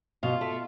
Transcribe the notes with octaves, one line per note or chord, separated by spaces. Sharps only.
B2 F4
A3